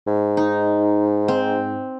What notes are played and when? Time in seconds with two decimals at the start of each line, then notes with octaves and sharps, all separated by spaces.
0.07 G#2
0.37 D#4
1.28 C4